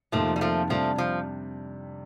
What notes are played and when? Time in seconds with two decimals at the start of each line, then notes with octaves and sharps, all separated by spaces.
0.12 F2 C3 D#3 F3 A3 A#3 F4
0.36 G3
0.41 F3 A3
0.70 C3 F3 G3 A3 D4
0.98 F3